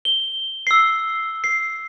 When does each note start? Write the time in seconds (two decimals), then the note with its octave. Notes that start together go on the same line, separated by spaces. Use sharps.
0.05 G7
0.67 E6 C7
1.44 C7